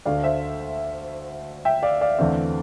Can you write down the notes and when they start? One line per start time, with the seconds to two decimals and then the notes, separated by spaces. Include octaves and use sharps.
0.05 D2 D3 A3 D5 F5
0.23 C5 E5
1.65 E5 G5
1.83 D5 F5
2.01 D5 F5
2.18 E2 D3 A3 C4